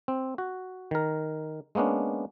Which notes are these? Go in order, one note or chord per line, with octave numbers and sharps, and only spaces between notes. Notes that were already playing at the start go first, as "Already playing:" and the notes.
C4
F#4
D#3 A#4
G#3 A#3 B3 C#4 D4